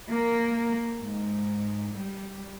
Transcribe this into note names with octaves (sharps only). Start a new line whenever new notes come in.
A#3
G#2
G3